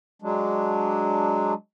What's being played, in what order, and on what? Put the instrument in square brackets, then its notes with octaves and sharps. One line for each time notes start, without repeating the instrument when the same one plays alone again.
[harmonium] F#3 G#3 D4